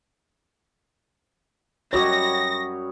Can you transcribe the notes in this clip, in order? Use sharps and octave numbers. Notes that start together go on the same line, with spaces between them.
F#2 G3 F#4 C#5 D#5 A#6